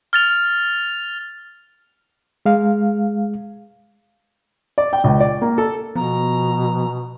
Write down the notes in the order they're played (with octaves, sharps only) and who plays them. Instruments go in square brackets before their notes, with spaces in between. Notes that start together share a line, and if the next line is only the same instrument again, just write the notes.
[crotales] F6 A6 F7
[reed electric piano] G#3 F5
[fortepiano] D5
G5
C#2
D5
A#3
A4
[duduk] B2 [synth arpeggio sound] F3 B3 [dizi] A#5